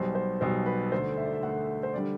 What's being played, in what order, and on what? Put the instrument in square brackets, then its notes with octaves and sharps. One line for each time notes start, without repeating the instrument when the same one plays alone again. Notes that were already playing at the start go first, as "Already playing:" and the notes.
Already playing: [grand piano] B1 B2 G3 C5
C5
B1 B2 G3 C5
B4
D2 D3 A3 C5
E5
D5
E5
D2 D3 A3 F#5
C5
D3 G3 D5